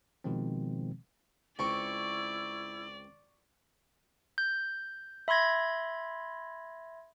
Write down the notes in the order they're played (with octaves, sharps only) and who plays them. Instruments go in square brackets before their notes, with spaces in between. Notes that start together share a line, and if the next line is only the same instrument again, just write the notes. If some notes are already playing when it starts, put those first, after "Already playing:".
[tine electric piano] B2 D#3 F3 G#3 C4
[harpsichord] C#2 C4 [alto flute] E4 [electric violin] D5 [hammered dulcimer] C#6
[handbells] G6
E5 B5 C6 G#6 A#6